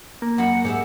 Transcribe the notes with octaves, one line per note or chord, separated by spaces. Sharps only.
A#3
F#2 F#5 B5
G#2 G4 G#4 E5